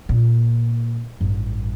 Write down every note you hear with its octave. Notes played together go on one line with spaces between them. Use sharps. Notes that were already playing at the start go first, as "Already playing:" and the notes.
A#2
A1 G2